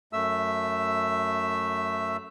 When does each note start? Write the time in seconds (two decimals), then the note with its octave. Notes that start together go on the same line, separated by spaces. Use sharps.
0.13 F#2 A3 E5 E6